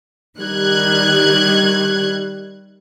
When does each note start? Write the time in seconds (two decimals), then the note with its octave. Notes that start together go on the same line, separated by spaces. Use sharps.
0.38 D#3 G3 F#6 G#6